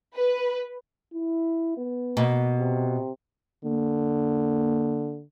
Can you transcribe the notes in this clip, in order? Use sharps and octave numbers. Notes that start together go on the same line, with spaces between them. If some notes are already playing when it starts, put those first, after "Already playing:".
B4
E4
B3
B2 A#3
C3
D3 A#3